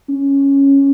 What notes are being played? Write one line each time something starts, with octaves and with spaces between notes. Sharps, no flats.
C#4